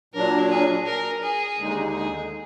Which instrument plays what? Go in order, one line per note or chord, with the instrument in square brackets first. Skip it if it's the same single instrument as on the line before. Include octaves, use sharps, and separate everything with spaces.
[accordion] A#2 F#3 D4 [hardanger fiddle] A#4
[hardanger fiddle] G#4
A#4
G#4
[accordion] D#2 D3 G#3 D#4
[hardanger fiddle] G#4